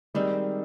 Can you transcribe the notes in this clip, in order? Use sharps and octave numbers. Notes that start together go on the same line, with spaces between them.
D#3 G3 G#3 C4